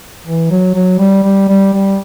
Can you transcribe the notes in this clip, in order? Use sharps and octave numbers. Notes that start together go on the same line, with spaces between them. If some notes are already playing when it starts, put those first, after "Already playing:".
E3
F#3
F#3
G3
G3
G3
G3